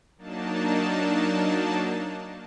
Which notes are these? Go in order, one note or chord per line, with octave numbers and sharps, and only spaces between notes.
F#3 A#3 D4 D#4 A5